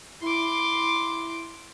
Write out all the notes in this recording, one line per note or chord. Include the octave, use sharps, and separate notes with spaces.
E4 C6 D6